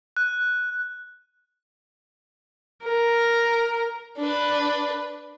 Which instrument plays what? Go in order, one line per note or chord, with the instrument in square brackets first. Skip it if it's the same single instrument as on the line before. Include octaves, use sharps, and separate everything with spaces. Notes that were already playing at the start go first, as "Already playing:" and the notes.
[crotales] F#6
[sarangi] A#4
[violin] D4 B4